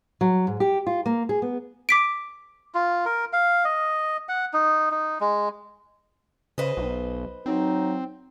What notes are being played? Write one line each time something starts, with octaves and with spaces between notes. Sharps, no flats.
F#3
G#2
G4
F4
A#3
G#4
B3
D6 B6 D7
F4
A#4
F5
D#5
F#5
D#4
D#4
G#3
C#3 B4 C5 D#5
B1
F#3 C4 D#4